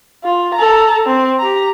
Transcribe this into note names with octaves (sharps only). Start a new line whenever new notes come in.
F4
A4 A#5
C4
G4 A#5